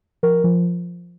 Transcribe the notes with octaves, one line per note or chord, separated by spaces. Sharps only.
F3 A#4
F3